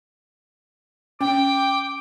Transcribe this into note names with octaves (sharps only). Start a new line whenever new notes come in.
C#4 G5 D6